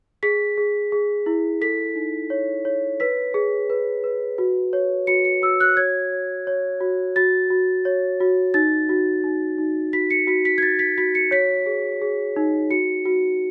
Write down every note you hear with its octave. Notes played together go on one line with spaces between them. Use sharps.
G#4 B6
G#4
G#4
E4
A4 B6
D#4
C#5
C#5
B4 B6
G#4
B4
B4
F#4
C#5
F#4 C#7
C#7
F#4 E6
F#6
C#5 G#6
C#5
C#5
F#4
F#4 A6
F#4
C#5
F#4
D#4 A6
F#4
D#4
D#4
F#4 B6
C#7
F#4 B6
B6
G#6
F#4 A6
B6
F#4 B6
C#7
C#5 B6
G#4
G#4
D#4
F#4 C#7
F#4